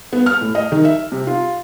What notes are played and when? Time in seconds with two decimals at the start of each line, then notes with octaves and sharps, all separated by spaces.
0.13 B3
0.26 F6
0.41 A2
0.55 D#5
0.72 D#3
0.85 E5
1.12 C3
1.27 F4